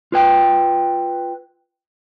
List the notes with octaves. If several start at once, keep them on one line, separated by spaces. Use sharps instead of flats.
F4 B4 G5